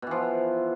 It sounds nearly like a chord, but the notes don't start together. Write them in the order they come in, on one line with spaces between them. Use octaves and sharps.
B2 E3 F3